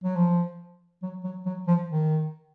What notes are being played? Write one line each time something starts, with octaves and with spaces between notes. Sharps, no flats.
F#3
F3
F#3
F#3
F#3
F3
D#3